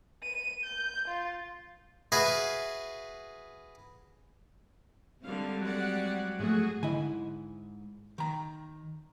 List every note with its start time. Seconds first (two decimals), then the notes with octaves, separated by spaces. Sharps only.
0.23 D#7
0.64 G6
1.08 F4
2.12 F#4 G#4 B4 E5 F5
5.23 D3 G3 G#3 C4 F5
5.61 F#3 D5 F#5
6.39 G#2 F3 A3 F#4 G#4
6.83 G#2 D3 E4 D#5 G#5
8.18 D#3 A#5